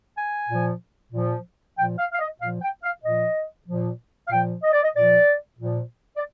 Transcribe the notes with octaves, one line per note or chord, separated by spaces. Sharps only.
G#5
A#2 F3
A#2 F3
A#2 F3 G5
F5
F5
D#5
A#2 F3 F5
G5
F5
A#2 F3 D#5
A#2 F3
F5
A#2 F3 G5
D#5
D5
D#5
A#2 F3 D5
A#2 F3
D5